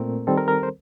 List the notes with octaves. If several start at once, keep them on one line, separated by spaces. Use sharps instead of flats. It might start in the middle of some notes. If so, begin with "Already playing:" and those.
Already playing: A#2 A3 C4 A#4
D#3 G3 C4 A4
A#4
A#4
C5